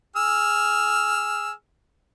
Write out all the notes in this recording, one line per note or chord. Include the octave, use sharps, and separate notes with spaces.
G#4 E6 F6